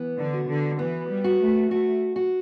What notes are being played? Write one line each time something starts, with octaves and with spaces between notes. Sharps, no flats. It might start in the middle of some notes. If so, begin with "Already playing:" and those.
Already playing: E3 B3
D3
F#4
D3
E3 B3
G3
F#4
A3
A3 F#4
F#4